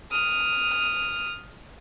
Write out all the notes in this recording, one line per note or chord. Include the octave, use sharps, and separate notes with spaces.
D#6 F6